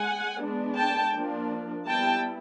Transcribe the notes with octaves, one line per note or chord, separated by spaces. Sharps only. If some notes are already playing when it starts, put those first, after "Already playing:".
Already playing: G#3 F#5 G#5
G#3 B3 D4
G5 A5
F3 A#3 D4
G3 B3 E4 G5 A5